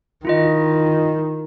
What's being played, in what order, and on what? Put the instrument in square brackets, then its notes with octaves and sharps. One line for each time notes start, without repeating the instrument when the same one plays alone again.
[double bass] D#3 [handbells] E4 F4 D#5